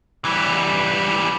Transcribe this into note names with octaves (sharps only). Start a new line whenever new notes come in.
E3 G3